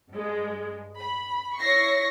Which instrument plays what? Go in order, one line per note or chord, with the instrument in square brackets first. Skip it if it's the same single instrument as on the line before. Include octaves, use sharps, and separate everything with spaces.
[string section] G2 G#3
B5
E4 C#5 C#6 A#6 C7